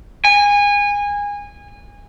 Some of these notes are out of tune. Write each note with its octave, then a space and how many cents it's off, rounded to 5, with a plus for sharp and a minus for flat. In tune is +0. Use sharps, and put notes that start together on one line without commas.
G#5 -25